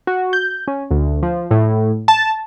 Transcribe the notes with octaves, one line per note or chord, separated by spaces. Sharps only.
F#4
G6
C#4
D2
F3
A2
A5